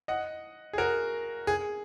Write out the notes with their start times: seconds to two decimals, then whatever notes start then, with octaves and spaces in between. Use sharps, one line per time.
0.08 D#5 F#5
0.73 G#4
0.78 F#4 A#4
1.47 G#4